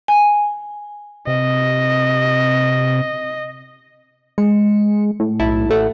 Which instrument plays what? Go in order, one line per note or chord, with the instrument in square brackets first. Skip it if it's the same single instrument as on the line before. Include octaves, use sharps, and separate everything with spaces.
[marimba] G#5
[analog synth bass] C3 [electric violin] D#5
[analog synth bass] G#3 [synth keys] C#7
[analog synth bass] A2
[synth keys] B1 E4 A5
A1 A3 F#5